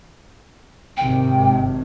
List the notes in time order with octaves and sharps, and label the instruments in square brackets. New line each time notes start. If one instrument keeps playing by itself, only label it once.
[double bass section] G#1 C3 D#3 [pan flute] G5